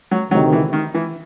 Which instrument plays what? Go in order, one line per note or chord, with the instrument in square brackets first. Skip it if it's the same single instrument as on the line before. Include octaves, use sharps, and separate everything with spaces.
[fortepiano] F#3
[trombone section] D2 C3 D#3 [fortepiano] F#3
[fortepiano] E3
D#3
E3